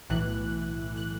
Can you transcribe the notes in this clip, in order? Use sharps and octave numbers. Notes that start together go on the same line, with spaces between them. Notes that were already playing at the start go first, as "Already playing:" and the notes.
B1 A2 E3 F#6
F#6